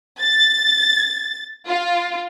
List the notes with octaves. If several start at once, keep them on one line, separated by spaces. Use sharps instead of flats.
A6
F4